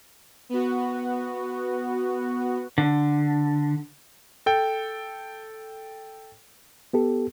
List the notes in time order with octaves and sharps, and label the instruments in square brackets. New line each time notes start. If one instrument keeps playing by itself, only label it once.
[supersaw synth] B3 F#4
[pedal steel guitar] D3
[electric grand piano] A4 G5
[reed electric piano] B3 G4 A4